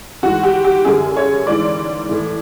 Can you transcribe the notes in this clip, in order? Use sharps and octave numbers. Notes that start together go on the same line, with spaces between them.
G#2 E3 F#4
G4
G4
F#2 D3 G#4
C#5
G#2 E3 D5
A2 E3